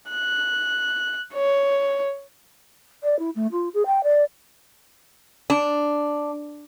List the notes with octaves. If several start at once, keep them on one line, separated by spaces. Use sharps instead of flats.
F#6
C#5
D5
E4
A3
F4
G#4
G5
D5
D4